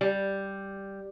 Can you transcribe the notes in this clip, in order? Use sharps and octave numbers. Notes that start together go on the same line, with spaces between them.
G3